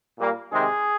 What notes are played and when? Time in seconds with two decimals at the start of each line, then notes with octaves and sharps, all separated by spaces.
0.17 A#2 G3 A#3
0.52 C3 D#3 G#3 C4 G#4